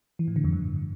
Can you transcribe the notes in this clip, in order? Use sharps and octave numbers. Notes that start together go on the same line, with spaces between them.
E3
A2
D3
F2
G2